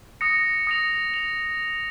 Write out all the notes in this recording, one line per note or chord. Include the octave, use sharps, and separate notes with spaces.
D#6 A#6 C#7
D#6 A#6 C#7 F7
F7